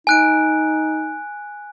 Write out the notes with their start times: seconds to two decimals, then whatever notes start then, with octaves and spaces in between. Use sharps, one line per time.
0.07 D#4 G#5 F#6 D7